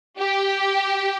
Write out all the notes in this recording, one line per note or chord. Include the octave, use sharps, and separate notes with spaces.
G4